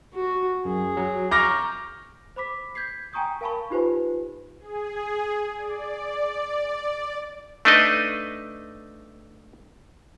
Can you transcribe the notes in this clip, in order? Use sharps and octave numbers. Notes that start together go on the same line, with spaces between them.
F#4
F#2 G#4
F#3
A#5 C#6 D6 F6 G6 A#6
C5 B5 D6 B6
G6 G#6 B6 C7
G5 G#5 A#5 C#6 D#6 G6
A#4 F5 G#5 A5 B5 C#6
D#4 F4 G4 B4 C5 G#5
G#4
D5
A3 D4 D#4 B4 D#5